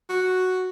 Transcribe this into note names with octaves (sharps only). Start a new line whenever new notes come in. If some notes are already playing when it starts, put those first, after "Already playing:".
F#4